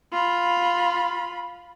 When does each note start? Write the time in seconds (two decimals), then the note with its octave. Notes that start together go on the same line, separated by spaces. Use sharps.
0.13 F4 B5